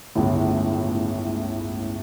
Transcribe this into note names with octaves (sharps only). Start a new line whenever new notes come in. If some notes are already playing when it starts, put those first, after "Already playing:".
G1 C#2 A2